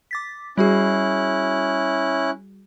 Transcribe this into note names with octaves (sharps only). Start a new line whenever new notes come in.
D6 A6 B6
G3 C#4 E4 F#4 G#4 F#6